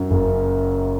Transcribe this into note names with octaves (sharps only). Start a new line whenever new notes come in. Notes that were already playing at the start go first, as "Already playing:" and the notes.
Already playing: F#2
F#1